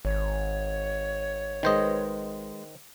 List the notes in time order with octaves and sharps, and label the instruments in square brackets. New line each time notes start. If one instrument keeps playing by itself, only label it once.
[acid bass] G#1 [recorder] C#5
[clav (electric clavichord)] D#3 C5 D#5 [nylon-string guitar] G#3 B4